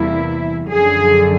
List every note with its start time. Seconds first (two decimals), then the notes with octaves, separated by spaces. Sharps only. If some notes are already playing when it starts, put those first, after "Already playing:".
Already playing: E2 C3 E3 G3 A#3 E4
0.68 F#2 D3 F3 G#4